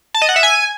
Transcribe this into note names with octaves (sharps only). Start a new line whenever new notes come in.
A5
D#5
F#5
E5
G#5